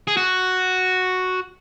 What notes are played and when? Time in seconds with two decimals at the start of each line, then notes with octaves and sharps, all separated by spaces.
0.08 G#4
0.17 F#4